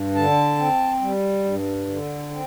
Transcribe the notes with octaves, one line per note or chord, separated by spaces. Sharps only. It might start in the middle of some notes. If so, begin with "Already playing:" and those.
Already playing: G2
D3 A5
C4
G3
G2
D3
C4